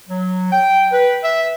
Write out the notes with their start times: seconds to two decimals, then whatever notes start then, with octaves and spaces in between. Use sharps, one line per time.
0.08 F#3
0.52 G5
0.92 B4
1.23 E5